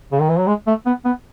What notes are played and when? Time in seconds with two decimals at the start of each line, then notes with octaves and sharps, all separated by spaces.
0.12 C#3
0.20 D#3
0.29 E3
0.38 F#3
0.47 G#3
0.67 A3
0.86 B3
1.05 B3